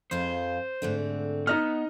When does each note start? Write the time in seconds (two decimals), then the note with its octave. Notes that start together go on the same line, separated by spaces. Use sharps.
0.11 F2 F4 G#4 C5
0.82 G#2 D3 A3 C4
1.47 B3 D#4 D#5 F6